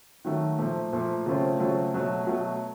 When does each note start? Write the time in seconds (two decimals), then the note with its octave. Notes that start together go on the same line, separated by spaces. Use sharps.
0.25 D#3 F#3 A3
0.59 A#2 F3 A3
0.93 A#2 F3 A3
1.26 C#3 F#3 A3 C4 F4
1.60 C#3 F#3 A3 C4 F4
1.94 B2 F#3 A3
2.27 B2 F#3 A3